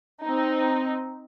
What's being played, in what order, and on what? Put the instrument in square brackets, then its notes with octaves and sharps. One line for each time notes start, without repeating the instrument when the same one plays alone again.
[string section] C4 D#4